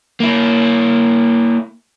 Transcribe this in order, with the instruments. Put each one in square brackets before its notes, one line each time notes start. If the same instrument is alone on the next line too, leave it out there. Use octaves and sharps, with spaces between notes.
[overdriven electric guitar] A#3 E4